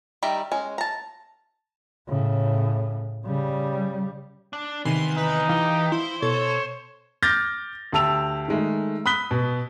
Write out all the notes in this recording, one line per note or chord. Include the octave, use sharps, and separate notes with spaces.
D#3 G3 G4 E5 A#5
G#3 C#4
A5 A#5
A2 C#3
C#3 G3
D4
C3 D#3 E3 B3 C6
D#4 B4
E3 G4 F5
E4 C5
B2 A4 C#5
D6 F6 G6 A6 A#6
D2 G4 A5 E6 F7
D#3 G#3 A3
B5 D#6 F#6 B6 G7
B2